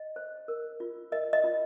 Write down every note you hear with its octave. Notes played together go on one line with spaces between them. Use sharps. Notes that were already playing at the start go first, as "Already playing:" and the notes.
Already playing: D#5
C5
A#4
F4
A#4 D#5
D#5
F4